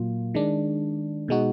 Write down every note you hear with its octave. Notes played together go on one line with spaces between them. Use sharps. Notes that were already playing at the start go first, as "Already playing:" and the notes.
Already playing: A#2 F#3 A#3 F4
D#3 G#3 D4
B2 G#3 D#4 F#4